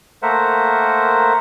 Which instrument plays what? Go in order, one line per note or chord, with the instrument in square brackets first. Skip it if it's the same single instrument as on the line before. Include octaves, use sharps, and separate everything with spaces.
[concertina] A3 A#3 A#4 C5 E5 F#5